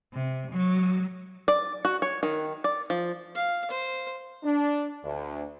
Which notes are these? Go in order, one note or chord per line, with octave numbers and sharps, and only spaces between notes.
C3
F#3
D5
F#4
C#5
D#3
D5
F3
F5
C5
D4
D2